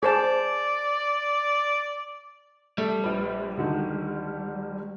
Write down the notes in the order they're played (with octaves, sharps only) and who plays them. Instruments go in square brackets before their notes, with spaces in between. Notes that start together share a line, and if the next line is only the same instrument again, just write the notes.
[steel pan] G#4 C5 A5 [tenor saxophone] D5
[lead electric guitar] G3 [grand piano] A3
[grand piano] A#1 B4
D2 D3 D#3